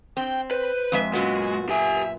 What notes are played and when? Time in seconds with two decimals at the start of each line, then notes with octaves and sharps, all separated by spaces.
0.17 C4 G5
0.51 B4 C5
0.92 F2 G#3 E5
1.13 F#2 A#2 G#3 B3 F#4
1.69 G4 E5 G#5